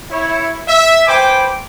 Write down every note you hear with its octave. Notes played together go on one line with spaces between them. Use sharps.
E4 C#5
E5
B4 C5 G5 G#5 B5 D6